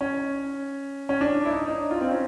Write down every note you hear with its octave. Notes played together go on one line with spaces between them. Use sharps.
C#4
C#4
D4
E4
D#4
D#4
F4
C4
C#4